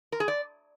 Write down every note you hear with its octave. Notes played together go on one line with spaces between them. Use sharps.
A#4
G#4
D5